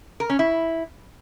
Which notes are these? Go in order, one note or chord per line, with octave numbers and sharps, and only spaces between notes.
A#4
C#4
E4